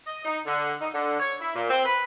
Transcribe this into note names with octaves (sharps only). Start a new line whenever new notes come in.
D#5
D#4
D3
D#4
D3
C#5
E4
A#2
C4
B4